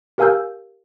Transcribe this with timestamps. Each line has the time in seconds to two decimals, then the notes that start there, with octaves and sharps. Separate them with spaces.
0.18 G4 A#4 F5 G#5 E6 G6